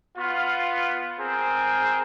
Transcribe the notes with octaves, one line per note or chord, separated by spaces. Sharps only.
B3 F4
C4 G#4 A#4